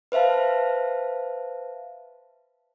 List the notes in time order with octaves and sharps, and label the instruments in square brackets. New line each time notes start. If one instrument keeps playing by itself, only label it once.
[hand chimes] B4 C5 E5 F5 A5